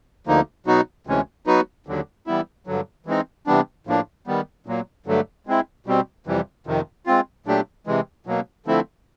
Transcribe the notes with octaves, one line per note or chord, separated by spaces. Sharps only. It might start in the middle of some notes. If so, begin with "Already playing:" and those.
D2 D3 F3 A#3 D#4
B2 F#3 B3 D#4 F#4
D2 C3 E3 G#3 C#4
F#3 B3 D#4 F#4 B4
D#2 D3 F#3
E3 G3 B3 E4
G2 D3 F#3
E3 G#3 C4 D#4
C3 E3 G3 B3 D4
A2 F3 A#3 D4
D#3 G3 B3
A#2 F#3 A#3
G2 D3 F#3 A3
G#3 C4 E4
B2 G3 C4
F2 C3 E3 G3
F2 C3 D#3
G#3 C4 F4
A#2 F#3 A3 D4 G4
C3 E3 G#3
B2 F#3 A#3
D3 F3 A3 C4 E4